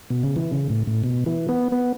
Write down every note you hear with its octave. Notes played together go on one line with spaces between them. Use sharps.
B2
C#3
E3
C#3
A2
A2
B2
E3
B3
B3